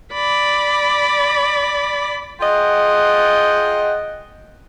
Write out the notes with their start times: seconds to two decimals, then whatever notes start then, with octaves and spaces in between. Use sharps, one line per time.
0.13 D5 B5
2.41 F4 G#4 D#5 F#5 G5